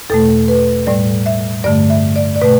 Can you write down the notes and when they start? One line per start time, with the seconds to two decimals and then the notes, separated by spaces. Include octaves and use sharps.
0.10 E2 B2 A3 A4
0.48 B4
0.87 A2 G3 D5
1.26 E5
1.64 G2 D3 A3 D5
1.90 E5
2.16 D5
2.36 D5
2.41 B2 A3 B4